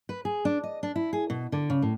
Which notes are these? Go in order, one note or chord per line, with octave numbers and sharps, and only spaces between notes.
B4
G#4
D4
D#5
D4
E4
G#4
B2
D3
C#3
A2